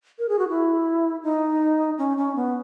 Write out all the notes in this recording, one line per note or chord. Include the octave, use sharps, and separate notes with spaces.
A#4
G#4
F#4
E4
D#4
C#4
C#4
B3